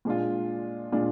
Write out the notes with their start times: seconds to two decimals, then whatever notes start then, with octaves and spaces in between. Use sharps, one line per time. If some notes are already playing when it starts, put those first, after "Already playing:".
0.05 A#2 G#3 D4 F4
0.92 A#2 G#3 D4 F4